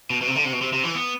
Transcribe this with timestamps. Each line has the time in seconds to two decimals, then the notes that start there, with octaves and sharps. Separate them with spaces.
0.10 B2
0.21 B2
0.27 C3
0.36 D3
0.45 C3
0.53 B2
0.61 C3
0.73 C3
0.84 E3
0.95 B3